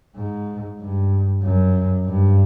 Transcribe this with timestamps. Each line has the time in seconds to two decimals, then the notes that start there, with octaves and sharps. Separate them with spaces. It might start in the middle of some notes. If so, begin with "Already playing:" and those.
0.16 G#2
0.79 G2
1.43 F#2
2.06 G2